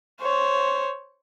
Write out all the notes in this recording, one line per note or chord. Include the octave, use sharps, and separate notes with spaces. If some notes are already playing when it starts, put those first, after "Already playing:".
C5 C#5